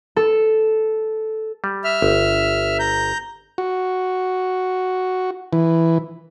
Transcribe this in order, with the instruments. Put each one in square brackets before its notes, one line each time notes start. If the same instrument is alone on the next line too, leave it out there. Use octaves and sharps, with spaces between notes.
[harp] A4
[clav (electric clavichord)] G3
[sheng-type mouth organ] E5 F6
[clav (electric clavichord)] G1
[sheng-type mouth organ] A#5 G6
[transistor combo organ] F#4
E3